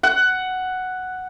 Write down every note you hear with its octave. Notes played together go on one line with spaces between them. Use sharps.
F#5